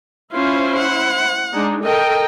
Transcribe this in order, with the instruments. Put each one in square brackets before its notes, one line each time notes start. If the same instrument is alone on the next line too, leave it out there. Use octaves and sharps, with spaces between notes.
[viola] C#4 F4 [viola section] E4 C5
[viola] F#5
[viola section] G#3 D4 D#4
[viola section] A4 A#4 G5 [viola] D#5